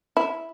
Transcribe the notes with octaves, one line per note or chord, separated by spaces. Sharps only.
E4